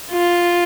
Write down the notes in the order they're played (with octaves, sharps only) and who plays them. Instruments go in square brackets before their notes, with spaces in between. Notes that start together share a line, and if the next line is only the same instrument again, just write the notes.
[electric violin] F4